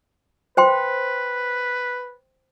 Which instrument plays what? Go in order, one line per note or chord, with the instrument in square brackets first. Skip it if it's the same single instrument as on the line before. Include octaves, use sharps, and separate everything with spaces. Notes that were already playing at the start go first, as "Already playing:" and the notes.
[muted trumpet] B4 [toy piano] C5 G5 C6